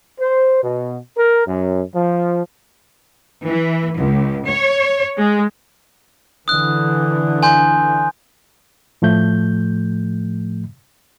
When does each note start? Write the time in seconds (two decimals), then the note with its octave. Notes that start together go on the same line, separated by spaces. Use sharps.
0.20 C5
0.63 B2
1.17 A#4
1.46 F#2
1.94 F3
3.47 E3
3.98 C#2
4.46 C#5
5.18 G#3
6.48 D3 E3 D#6 F#6
7.43 G#5 C6 G6
9.02 A2 F3 A3 G6